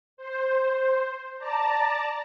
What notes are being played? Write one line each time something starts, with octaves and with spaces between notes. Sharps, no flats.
C5
D5 A5 A#5